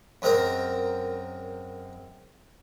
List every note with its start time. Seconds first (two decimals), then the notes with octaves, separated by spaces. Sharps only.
0.22 F#2 G#3 C4 A#4 A#5